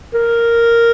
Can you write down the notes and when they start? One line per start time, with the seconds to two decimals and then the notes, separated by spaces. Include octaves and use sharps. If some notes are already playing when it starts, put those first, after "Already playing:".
0.14 A#4